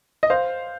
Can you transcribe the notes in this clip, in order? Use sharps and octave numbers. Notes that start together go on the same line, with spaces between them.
D#5
C5 F5